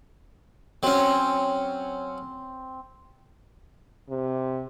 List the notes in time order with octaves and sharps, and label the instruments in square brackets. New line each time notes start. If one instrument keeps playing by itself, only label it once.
[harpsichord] F#3 C#4 [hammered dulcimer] C4
[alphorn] C3